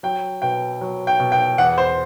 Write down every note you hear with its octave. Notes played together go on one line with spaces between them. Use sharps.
F#3 G5
B2 G5
F#3
G5
B2
G5
E2 F#5
C5